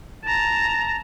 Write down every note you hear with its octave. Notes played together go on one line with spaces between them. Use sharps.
A5 A#5